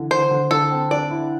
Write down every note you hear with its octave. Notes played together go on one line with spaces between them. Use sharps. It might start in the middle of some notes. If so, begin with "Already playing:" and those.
Already playing: D3 E3
D3 C5
D3
D3 A4
C4
D4 D5
E4